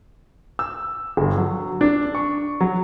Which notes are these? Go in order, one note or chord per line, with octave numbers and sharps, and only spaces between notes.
E6
G1
F#3
D4
C#6
F#3